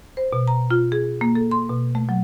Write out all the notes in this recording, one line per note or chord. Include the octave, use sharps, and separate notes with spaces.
C5
B2
A#5
F4
G#4
A#3
A4
C6
B2
A3
F#3